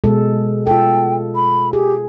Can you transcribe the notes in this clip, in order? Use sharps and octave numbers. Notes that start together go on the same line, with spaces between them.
B2 G#3 A4
F4 A4 G5
B5
G4 G#4